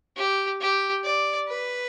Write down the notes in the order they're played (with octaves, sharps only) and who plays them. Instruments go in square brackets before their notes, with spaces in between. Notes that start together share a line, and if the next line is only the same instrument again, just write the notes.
[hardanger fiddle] G4
G4
D5
B4